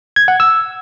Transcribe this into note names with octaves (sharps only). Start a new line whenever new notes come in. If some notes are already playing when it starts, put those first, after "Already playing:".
G#6
F#5
E6